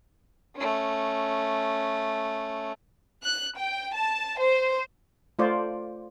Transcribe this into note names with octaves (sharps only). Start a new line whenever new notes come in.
A3 C#4
F#6
G5
A5
C5
A3 F4 C5 D5